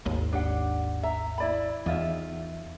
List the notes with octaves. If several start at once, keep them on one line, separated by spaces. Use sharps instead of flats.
G#1 D#2
D4 G4 F#5
E5 A#5
E4 D5 B5
E2 D#4 F4 E5